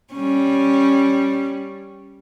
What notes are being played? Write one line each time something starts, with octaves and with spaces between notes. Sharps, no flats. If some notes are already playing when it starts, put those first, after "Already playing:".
G3 C#4